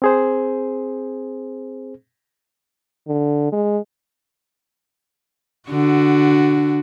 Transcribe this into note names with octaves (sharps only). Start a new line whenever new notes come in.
C4 G#4 C5
D3
G#3
D3 F#4